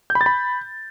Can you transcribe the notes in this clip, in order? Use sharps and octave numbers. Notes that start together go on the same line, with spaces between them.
G6
B5
A6
B5